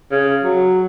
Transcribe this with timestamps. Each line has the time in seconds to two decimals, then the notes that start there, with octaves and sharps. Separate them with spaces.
0.11 C#3
0.44 F#3